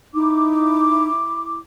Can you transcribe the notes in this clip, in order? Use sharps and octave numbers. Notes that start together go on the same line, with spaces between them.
D#4 E4 D6